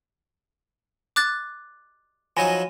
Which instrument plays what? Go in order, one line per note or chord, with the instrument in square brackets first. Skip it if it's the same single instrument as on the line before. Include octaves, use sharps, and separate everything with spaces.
[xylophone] D6 F#6 A6
[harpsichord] F3 F#3 D#4 [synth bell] G#5 A#6 D#7